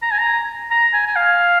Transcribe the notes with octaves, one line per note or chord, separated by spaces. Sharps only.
A#5
G#5
A#5
A#5
G#5
G#5
F5